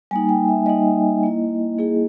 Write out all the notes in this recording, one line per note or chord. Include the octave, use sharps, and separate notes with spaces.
G3 A#3 D#4 G#5
G5
E5
G3 A#3 D#4 D#5
A#3 E4
A#3 E4 G#4